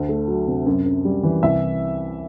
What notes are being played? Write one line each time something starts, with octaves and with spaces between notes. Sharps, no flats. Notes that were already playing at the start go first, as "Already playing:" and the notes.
Already playing: D2 D3
A3
F#3
C3
F#2
F#2
G3
E3
C2 E5